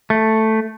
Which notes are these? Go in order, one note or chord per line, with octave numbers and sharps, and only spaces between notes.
A3